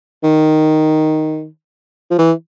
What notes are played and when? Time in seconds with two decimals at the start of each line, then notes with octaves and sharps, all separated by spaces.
0.24 D#3
2.11 F3
2.18 E3